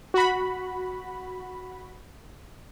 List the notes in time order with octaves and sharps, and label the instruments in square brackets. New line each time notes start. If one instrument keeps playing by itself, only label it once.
[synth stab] F#4 B5